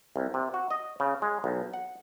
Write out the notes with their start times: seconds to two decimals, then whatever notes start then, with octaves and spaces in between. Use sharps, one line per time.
0.16 C2
0.34 C3
0.54 F#4
0.71 D#5
1.00 C#3
1.22 G#3
1.44 B1
1.74 F#5